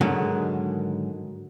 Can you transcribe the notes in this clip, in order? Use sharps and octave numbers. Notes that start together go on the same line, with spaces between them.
G#2 D3 D#3 F#3 G#3